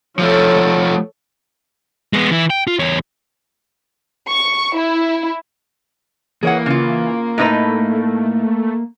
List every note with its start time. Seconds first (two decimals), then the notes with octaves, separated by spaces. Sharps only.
0.19 F3 A3 A4 C#5
2.13 G#3 B3
2.31 E3 E4
2.50 G5
2.67 F4
2.79 E2 C#5
4.30 C#6
4.77 E4
6.43 E3 A#3 G#4 C#5 F#5
6.66 C#3 F4
7.38 A2 A3 D#4 B4